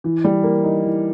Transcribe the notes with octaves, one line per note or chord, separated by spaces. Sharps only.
E3
G3
A#3
D#4
E3